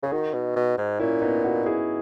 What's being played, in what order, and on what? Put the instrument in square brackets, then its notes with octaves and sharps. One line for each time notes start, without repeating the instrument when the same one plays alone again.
[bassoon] C#3 [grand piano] G#4
[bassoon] D#3 [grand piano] D#4 F#4
[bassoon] B2
B2
G#2
[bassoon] A#2 [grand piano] C#4 E4
[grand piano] B3 D#4
D#4 F#4
E4 G#4